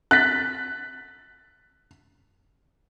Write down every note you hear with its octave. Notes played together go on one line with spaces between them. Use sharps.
F#6 A6 B6